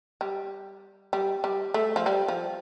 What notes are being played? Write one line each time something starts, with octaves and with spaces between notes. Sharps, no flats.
G3
G3
G3
A3
F3
G3
F3